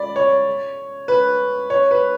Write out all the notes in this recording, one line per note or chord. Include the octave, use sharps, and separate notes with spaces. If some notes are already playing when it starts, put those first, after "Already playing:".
Already playing: D5 B5
C#5
B4
C#5
B4